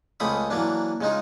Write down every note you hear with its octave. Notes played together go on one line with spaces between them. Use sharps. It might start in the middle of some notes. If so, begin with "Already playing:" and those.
C#2 C#3 A3 C4 B5 D#6
E3 F#3 A#3 D4
C#3 G#3 D#4 F4